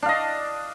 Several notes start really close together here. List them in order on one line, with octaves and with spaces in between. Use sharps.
D4 F5 D#5